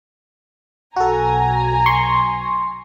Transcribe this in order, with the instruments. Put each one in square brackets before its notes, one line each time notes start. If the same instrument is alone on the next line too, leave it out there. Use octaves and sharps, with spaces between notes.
[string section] B1 G#5 A#5 [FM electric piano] F#4 A4
[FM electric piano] C6 C#6